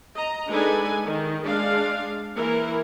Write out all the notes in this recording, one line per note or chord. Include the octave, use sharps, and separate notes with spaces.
D#5 A#5
G#3 D4 D#4 A4 B4 G#5
D#3
G#3 D4 F5
E3 A#3 E4 A#4